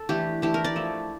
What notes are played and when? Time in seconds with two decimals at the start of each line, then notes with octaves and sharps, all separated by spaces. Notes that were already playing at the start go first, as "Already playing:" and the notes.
Already playing: A4
0.09 E3 A3 D4 G4
0.42 E3 A3 D4 G4
0.54 A#4
0.64 D5
0.76 F3 A3 E4